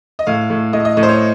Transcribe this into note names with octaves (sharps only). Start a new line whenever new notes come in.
D#5
A2 F5
A2
A2 D#5
D#5
A2 D#5
C5
C#5